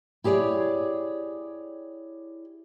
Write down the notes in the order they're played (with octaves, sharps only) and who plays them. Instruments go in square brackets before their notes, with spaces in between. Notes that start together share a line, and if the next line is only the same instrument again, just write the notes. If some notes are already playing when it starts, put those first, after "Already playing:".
[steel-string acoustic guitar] E4 G4 G#4 C#5 D5